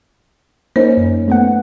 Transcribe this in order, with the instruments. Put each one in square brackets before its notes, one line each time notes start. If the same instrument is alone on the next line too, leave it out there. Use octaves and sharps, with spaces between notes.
[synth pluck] A#3 C#4 D#4 [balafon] C5
[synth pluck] F#2
A3 B3 F#5